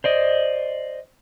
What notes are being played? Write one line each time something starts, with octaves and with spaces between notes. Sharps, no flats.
C5 D5 D#5